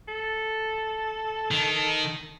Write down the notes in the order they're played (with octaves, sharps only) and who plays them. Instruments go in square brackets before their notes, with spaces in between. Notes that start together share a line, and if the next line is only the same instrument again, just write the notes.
[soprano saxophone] A4
[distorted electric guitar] D#3